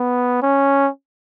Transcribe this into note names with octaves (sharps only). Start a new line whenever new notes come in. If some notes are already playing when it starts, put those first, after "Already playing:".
Already playing: B3
C#4